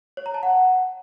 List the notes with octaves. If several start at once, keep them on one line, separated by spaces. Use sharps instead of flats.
C#5
A#5
A5
F#5